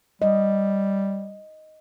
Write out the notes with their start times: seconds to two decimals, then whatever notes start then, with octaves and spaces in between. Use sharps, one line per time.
0.22 G3 D#5